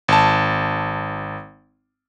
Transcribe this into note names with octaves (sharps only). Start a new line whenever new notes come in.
G#1 A5